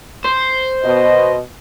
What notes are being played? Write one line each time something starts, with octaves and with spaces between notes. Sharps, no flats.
C5
B2 D#5